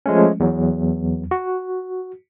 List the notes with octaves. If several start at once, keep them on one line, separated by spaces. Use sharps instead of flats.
F3 G#3 A3 C#4
E2 F#3
F#4